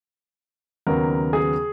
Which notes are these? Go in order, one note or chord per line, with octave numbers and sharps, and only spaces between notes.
D#2 C#3 F#3 B3 A#4
G#4